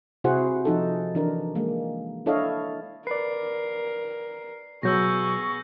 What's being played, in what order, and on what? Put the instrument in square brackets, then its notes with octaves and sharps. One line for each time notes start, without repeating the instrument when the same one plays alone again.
[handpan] C3 E4 F#4 G#4 C5 F#5
F3 D#4 A4
E3 D4 A#4
G#3 A#3
D4 E4 A4 C#5 D#5 F5
[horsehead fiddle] A#4 [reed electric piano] B4 D5 [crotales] C7
[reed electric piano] B2 F#3 [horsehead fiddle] B3 G#4 [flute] C#6 [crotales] E6 G6 A#6